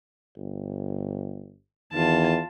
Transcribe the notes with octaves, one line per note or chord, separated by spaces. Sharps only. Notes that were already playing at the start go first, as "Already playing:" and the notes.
G1
E2 D#3 F4 A5